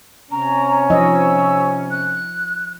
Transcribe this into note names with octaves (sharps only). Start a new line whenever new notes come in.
C3 C#4 A#5
F3 D#4 D#5 E6
F#6